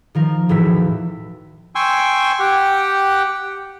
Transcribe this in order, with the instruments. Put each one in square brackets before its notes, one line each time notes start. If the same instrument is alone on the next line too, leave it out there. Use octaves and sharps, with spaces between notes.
[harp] D#3 F3 A#4
E1 A2 E3 E6 B6
[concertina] G5 G#5 C6 C#6 E6
G4 F#5 G5